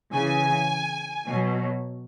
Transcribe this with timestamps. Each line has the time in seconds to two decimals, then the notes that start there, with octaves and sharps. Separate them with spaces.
0.13 C#3 E3 G#5
1.26 B2 F#3